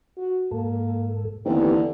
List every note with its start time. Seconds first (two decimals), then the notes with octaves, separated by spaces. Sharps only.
0.17 F#4
0.51 G#2 A#3 A4
1.45 D#2 D3 E3 B3 C4 G4